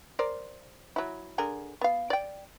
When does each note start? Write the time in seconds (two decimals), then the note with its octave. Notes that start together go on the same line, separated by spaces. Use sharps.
0.19 A#4 C5 D5
0.96 F#3 E4
1.38 D3 G#4 A#4
1.81 B3 F5
2.10 D5 G5